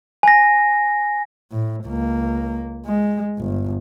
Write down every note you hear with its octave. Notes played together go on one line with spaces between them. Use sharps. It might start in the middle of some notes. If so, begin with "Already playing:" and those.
G#5 A#6
A2
C#2 A#3
G#3
G1